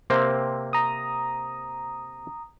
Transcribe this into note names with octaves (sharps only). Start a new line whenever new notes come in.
C3 A#3 C4
A#5 D#6